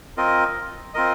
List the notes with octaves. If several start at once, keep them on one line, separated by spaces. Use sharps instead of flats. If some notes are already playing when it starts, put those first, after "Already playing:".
C4 F4 A#4 D#5
C4 F4 A#4 D#5